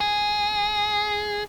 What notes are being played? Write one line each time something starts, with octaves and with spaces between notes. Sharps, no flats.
G#4